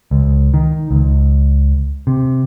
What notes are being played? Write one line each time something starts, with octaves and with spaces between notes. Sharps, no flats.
C#2
D#3
C#2
C3